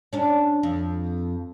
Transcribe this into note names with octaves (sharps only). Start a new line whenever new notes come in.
C#4 D4
F2